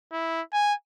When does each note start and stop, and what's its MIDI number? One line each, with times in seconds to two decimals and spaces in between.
0.12 0.41 64
0.53 0.74 80